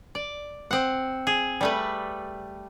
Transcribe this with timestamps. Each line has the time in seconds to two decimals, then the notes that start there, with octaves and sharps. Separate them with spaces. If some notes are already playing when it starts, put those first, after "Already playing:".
0.15 D5
0.71 C4 F#5
1.27 G#4
1.61 G3 A3 B4